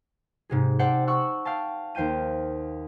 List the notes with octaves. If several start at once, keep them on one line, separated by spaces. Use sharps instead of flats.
G#2 C3 G#4
G4 A4 C5 D5 F#5
F#5 C#6 E6 F#6
F5 G5 A5
D#2 C5 G5 G6 D#7